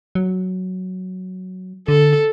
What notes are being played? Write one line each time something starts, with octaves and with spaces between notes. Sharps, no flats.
F#3
D3 A4